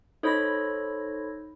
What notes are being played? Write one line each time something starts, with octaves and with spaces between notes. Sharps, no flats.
D#4 A4 C5 C#5 B5 A#6